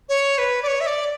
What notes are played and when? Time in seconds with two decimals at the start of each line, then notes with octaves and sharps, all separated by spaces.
0.09 C#5
0.38 B4
0.63 D5
0.67 C#5
0.81 E5
0.87 D5